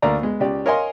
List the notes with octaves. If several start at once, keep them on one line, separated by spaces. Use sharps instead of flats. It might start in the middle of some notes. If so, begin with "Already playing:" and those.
D2 A#3 D5 F5 A#5
G#3 B3
C#2 G4 D5
A#4 C#5 D#5 F5 G#5 C6